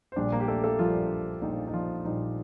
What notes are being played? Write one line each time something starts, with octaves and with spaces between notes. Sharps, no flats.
C5
A#1 A#2 G3 D4 D5
A#3 A#4
G4
A3 A4
A3 A4
A#1 A#2 F3 G3 F4
A#1 A#2 G3 D#4
D#4
F3 F4
A#1 A#2 G3 D#4